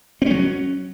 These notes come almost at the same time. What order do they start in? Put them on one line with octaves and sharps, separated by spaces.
C4 C#4 F#3